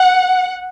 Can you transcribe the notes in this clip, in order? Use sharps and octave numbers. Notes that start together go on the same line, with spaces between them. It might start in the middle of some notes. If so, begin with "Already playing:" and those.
Already playing: F#5